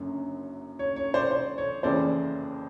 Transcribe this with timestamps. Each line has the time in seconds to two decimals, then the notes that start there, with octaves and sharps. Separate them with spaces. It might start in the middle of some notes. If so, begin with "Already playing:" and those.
Already playing: F#1 F#2 D3
0.79 C#5
0.96 C#5
1.14 C5 D5
1.31 C5
1.58 C#5
1.83 F#1 F2 C#3 E3 C5 D5